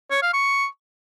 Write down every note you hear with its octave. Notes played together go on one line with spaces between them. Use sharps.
C#5
F5
C#6